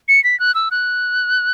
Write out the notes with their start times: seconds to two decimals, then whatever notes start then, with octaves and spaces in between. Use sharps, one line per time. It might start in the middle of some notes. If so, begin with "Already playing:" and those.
0.08 C#7
0.24 B6
0.40 F#6
0.55 E6
0.71 F#6